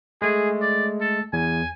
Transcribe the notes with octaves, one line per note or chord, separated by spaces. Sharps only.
G#3 A3 G#4
D5
A4
E2 G#5